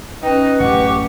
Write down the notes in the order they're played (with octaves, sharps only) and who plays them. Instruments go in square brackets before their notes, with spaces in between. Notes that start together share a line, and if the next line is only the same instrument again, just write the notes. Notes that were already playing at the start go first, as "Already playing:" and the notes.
[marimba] C#4 G5 [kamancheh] D#4 [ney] B4
[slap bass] A1 F#2 [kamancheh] G4 C#6 [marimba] F#5